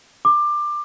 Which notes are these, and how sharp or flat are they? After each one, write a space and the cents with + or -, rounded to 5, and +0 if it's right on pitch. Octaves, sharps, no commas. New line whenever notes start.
D6 +20